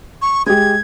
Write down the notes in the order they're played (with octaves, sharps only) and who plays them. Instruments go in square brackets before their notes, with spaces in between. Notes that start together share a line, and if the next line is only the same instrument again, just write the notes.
[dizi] C#6
[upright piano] G#3 G4 [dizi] G#6